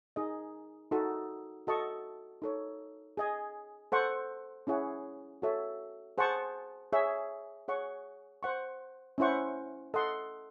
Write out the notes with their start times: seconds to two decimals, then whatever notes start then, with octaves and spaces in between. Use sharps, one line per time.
0.16 D#4 G#4 D#5
0.92 D#4 F#4 A4
1.67 F#4 A4 D#5 A5 C#6
2.42 D#4 A4 C#5
3.17 G#4 D#5 G#5
3.92 A4 C5 F#5 C#6
4.67 C#4 E4 G#4 C#5 F#5
5.42 F#4 A4 C#5 E5
6.18 G#4 C5 F#5 A5 C#6
6.93 G#4 C#5 E5
7.68 G#4 C#5 F#5 C#6
8.43 C5 F#5 C#6
9.18 C#4 E4 C5 F#5 C#6
9.94 A4 D#5 F#5 C6